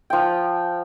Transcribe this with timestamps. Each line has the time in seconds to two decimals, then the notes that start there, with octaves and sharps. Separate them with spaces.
0.10 F3 G5